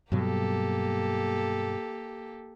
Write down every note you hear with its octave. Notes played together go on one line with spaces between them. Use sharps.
G2 B2 F#3 A#3 G4 A4